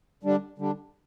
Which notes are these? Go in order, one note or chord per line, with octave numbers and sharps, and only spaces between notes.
D3 G3 D4
D3 G3 D4